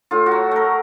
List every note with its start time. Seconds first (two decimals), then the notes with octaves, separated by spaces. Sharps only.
0.11 A2 F4
0.26 F#4
0.31 F#3
0.51 A3 A#4